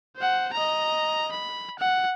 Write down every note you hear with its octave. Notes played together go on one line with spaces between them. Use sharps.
C5 F#5
D#5 A#5
B5
F#5